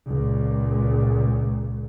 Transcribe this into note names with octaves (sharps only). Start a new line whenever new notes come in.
C#2 A#2